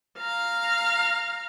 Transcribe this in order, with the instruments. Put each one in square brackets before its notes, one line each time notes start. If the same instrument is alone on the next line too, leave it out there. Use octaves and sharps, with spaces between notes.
[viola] F5 A#5